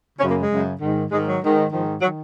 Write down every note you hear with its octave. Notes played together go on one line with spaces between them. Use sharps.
F#2 C#3 C#4
A#3
G#3
F#2 C#3
G#2 D#3
G#2 D#3 G#3
F#3
G#2 D#3
G#2 D#3 F3
F#3
D#3